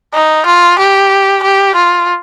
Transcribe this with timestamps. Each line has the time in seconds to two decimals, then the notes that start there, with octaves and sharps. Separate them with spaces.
0.14 D#4
0.46 F4
0.79 G4
1.43 G4
1.75 F4